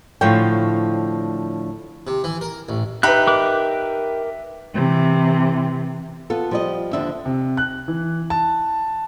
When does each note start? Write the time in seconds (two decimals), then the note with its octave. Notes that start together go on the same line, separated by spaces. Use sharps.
0.21 A2 D3 F3 C5 C#5 G5
2.07 C3
2.24 E3
2.41 A#4
2.69 A1
3.03 D#4 G4 B4 E5 B5 F#6
3.27 A#4 D6 F#6
4.74 C3 E3
6.30 B3 F4 A4
6.51 F3 G3 D#5
6.93 D#2 D3 F3 D4 E5
7.26 C3
7.57 F#6
7.88 E3
8.30 A5